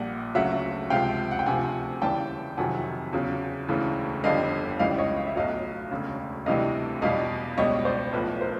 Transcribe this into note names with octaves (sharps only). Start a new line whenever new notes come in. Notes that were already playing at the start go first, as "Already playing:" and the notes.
Already playing: A#1 A#2 G3 F#5
D2 C#3 F#3 E5 F#5
C#2 C3 F3 F5 G5
F#5
G5
D2 C3 F3 F#5 G#5
D#2 C#3 E3 G3 G5 A5
F2 C3 D#3 F#3 F#5 G#5
E2 C#3 F#3
E1 D2 C#3 E3
G1 F2 D3 G3 D#5 F5
C#2 C#3 E3 G3 D#5 F5
C#5 D#5
F5
E5
B1 A2 F#3 D#5 F5
E1 D2 C#3
D2 C3 E3 G3 D#5 F5
E2 B2 G3 D#5 F5
C#2 B2 G3 C#5 D#5
C5 D5
B1 A2 F3 B4
A#4 C5